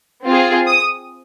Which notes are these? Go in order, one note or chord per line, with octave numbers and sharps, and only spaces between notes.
C4 F4 G#4
D#6